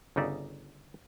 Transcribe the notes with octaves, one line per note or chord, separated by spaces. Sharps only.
G1 C#3 D#4 D5 E5